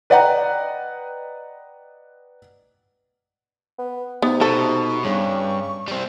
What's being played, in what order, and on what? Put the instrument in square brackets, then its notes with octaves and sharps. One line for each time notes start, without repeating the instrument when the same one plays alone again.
[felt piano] B4 D5 D#5 F#5 G5 A#5
[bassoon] B3
[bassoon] C3 [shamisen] B3 [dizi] D#4
[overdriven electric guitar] B2 [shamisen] A4
[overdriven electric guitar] G2 [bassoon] C#3 [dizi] C#6
[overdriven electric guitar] G3 C4